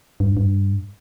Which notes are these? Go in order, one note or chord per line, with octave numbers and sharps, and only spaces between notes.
G2
G2